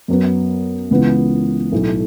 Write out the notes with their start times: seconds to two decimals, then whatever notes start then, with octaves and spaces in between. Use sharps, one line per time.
0.08 F#2 F#3 B3
0.91 C#2 C#3 E3 B3
1.72 B1 A2 A3